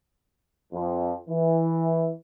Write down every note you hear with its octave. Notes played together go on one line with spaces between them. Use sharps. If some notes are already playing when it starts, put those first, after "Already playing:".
F2
E3